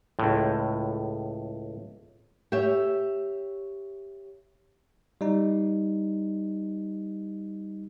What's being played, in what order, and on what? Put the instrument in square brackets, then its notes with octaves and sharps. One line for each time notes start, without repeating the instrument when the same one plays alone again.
[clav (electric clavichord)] C#2 A2
[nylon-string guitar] G4 C#5 E5
[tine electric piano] G3 D#4